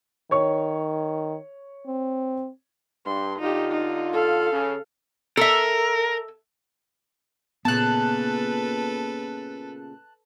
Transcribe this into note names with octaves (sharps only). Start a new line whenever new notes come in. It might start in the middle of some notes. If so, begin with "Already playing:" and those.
D#3 C#5 C#6
C4
G2 C6
D3 D#4 F4 G4
D#4
A4 F5
C#3
A4 A#4 E5
A#2 C#3 B3 A4 B4 A5 F#6